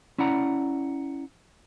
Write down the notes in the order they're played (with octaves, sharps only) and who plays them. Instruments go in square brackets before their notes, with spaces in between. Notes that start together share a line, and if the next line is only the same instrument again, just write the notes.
[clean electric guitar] C#4 E4 D5 F#5 A#5